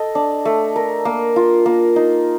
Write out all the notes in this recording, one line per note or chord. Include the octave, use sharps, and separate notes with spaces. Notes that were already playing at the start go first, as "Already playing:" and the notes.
Already playing: A4 D#5
D4
A3
A#4
A#3
F4
A#3
D#4